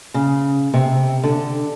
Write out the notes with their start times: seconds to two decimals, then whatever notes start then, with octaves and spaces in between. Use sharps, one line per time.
0.14 C#3
0.74 C3
1.23 D3